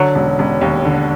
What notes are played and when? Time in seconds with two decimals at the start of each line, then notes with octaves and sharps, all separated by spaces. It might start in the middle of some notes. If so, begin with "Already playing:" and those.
Already playing: D3 F#3
0.15 E1
0.39 E1
0.61 D#2
0.85 D3